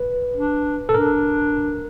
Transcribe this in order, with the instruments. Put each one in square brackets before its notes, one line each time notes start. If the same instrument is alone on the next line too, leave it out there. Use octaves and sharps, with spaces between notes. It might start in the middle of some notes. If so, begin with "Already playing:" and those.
Already playing: [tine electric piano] B4
[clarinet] D4
[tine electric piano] A4
[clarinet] D4 [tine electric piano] A#4